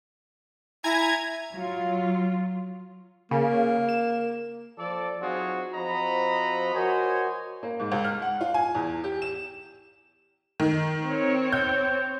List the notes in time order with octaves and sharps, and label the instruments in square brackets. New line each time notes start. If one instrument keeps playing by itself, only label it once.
[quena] E4 [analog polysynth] G#5 A#5 G#6
[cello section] F#3 F4
[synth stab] C#3 [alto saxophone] A#3
[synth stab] E7
[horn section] F3 A4 D5
F#3 C4 D#4 F4 F#4 G#4
F3 C4 F#4 D#5 A#5 B5
F#4 A#4 C5 C#5 D#5 G#5
[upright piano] A#3
G#2
C#2
F6
F#5
F4
G#5
E2
G4
E7
[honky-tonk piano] D#3
[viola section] C4 C#5
[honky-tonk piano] G6